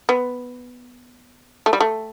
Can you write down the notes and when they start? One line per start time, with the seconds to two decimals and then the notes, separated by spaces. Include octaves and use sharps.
0.09 B3
1.66 A3
1.73 G3
1.81 A3